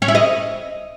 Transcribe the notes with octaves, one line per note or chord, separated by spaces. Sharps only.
C#4
E4
D#5